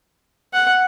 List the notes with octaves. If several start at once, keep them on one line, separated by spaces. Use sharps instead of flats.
F#5